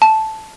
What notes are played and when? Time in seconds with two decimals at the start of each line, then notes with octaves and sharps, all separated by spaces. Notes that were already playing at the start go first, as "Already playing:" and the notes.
0.02 A5